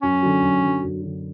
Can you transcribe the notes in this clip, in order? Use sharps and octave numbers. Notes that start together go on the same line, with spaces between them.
F#2 C#4
D3 F#3
F#2
D3 F#3
F#2
D3 F#3